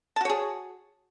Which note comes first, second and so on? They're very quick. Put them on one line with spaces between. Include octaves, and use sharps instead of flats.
A5 F#4 C#5 G#4